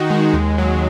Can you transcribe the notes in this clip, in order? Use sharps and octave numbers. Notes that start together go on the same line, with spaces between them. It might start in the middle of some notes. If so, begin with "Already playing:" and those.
Already playing: D#3 D#4 F#4
G#3
D#2
F#3